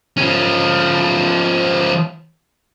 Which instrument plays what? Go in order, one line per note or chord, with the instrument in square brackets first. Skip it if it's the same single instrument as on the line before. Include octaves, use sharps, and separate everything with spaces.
[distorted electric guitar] F3 C#4